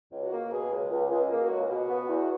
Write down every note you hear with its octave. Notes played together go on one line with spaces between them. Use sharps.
C#2
F#4
A#3
B2 G#4
C#2
C#2
C#2 G#4
A#3
F#4
C#2
B2 F#4
B3
E2